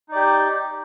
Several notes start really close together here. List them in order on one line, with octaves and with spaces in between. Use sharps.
D#4 D5 G4